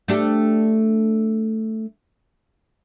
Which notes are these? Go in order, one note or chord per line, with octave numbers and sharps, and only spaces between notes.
A3 D4 G4